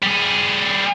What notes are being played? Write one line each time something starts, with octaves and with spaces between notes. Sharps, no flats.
G3 G#4